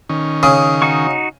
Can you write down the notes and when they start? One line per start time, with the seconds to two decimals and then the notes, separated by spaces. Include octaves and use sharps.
0.09 D#3 C#4
0.43 C#3 D#6
0.82 D#4 F#4 C#6